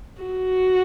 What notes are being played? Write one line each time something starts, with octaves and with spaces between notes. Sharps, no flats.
F#4